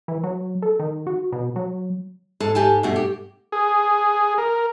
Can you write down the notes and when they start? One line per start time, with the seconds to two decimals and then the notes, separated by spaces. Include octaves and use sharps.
0.08 E3
0.24 F#3
0.62 A4
0.79 D#3
1.07 F#4
1.32 B2
1.56 F#3
2.40 G#2 A4 A5
2.55 G#2 G4 G#5 A5
2.83 G2 B2 A3 F#4
2.96 G4
3.52 G#4
4.38 A#4